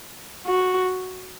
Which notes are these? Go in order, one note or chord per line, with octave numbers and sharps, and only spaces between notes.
F#4